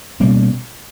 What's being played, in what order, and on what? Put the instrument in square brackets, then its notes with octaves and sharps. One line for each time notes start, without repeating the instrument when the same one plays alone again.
[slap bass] B2 G3 A#3 C#4